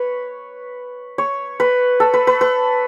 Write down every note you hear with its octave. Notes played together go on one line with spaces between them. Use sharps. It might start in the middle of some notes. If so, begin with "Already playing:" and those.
Already playing: B4 C#5
C#5
B4
A4
B4
B4
B4